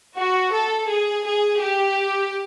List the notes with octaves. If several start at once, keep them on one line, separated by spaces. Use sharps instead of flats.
F#4
A4
G#4
G#4
G4